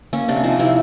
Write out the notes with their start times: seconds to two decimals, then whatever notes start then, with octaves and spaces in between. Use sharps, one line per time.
0.13 A#3 C#4
0.28 C3 D4
0.44 F3 D#4
0.59 C3 E4